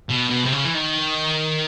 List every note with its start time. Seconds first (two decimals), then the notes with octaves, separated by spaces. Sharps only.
0.09 B2
0.30 B2
0.45 C3
0.52 C#3
0.64 E3
0.74 D#3